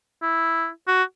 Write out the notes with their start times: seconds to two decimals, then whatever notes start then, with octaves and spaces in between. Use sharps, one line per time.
0.22 E4
0.88 F#4